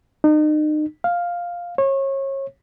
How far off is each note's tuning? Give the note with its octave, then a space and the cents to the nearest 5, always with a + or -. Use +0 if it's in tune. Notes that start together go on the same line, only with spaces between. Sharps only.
D#4 -35
F5 +5
C#5 -30